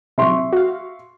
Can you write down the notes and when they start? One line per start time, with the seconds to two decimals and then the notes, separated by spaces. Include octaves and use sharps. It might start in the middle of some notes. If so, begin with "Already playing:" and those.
0.18 C3 F#3 E5 C6 C#6
0.53 F#4 F5